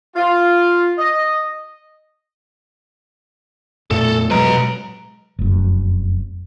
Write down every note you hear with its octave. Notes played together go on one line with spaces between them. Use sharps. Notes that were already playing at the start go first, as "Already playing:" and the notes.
F4
D#5
F2 A#2 A3 A4
B2 F#3 G#3 B4 A#5
F1 F#2